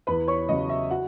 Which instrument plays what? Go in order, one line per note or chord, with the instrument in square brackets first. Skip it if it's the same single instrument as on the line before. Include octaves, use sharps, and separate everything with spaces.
[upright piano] E2 B4 B5
C#5 C#6
C#3 F#3 D#5
E5
F#4 F#5